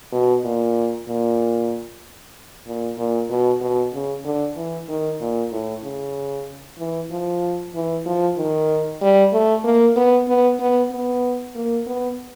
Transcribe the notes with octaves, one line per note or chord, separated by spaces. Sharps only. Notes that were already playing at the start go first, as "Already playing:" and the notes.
B2
A#2
A#2
A#2
A#2
B2
B2
C#3
D3
E3
D#3
A#2
A2
C#3
E3
F3
E3
F3
D#3
G3
A3
A#3
B3
B3
B3
B3
A#3
B3